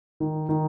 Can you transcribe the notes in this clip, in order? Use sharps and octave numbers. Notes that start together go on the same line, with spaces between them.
D#3
D#3